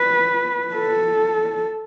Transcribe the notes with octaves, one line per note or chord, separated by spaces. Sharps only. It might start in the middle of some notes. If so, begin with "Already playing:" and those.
Already playing: B4
A4